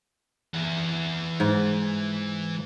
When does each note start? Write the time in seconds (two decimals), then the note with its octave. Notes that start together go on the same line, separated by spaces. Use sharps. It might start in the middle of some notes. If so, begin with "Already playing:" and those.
0.54 E3 F#5
1.40 G#2